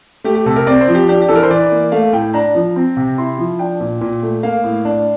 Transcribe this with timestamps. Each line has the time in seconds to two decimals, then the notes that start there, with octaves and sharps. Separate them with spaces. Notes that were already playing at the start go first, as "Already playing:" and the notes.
0.24 A3 G4
0.35 G4
0.46 C3 A4
0.56 A#4
0.67 C4 D5
0.81 C5
0.88 F3
0.95 G4
1.09 D4 G4
1.22 G4
1.29 E3 A4
1.36 A#4
1.43 C5
1.50 E3 D5
1.72 A#3
1.92 A3 F5
2.13 A2 G5
2.34 D4 A#5
2.55 F3
2.76 C4
2.97 C3
3.17 E4 C6
3.39 F3
3.59 D4 G5
3.80 A#2
4.01 A#2
4.23 A3
4.43 A#3 F5
4.64 A2
4.85 D4